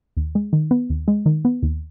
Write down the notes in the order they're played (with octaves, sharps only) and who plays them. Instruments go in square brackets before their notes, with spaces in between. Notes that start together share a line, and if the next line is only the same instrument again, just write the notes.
[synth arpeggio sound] D#2
G#3
D#3
B3
D#2
G#3
D#3
B3
D#2